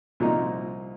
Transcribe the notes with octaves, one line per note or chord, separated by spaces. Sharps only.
C2 A#2 F3 A#3 D#4